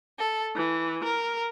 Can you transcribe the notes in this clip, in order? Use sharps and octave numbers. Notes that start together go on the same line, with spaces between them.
A4
E3
A#4